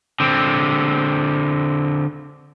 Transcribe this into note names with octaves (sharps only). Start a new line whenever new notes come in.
D3 C4